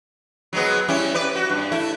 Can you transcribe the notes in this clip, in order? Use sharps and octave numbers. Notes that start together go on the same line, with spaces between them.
F#3 G#3 B3
G3 C#4 E4
B4 D5
F#4
G2
A3 E4